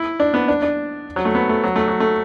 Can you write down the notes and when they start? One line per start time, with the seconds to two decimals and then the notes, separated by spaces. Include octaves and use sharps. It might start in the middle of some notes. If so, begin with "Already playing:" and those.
Already playing: E4
0.20 D4
0.34 B3
0.48 D4
0.62 D4
1.16 F#3
1.25 A3
1.35 B3
1.49 A3
1.64 F#3
1.76 A3
1.88 F#3
2.00 A3